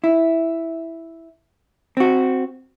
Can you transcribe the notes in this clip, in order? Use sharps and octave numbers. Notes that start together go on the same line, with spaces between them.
E4
C4 F#4